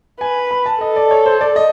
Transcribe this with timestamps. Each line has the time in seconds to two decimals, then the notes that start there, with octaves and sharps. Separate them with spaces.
0.20 B4 G#5
0.51 B5
0.66 A5
0.80 A4 D#5
0.96 D5
1.11 C#5
1.26 C5
1.41 D5
1.56 D#5